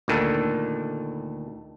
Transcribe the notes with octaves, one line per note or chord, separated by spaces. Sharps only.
D2 A#2 D#3 A4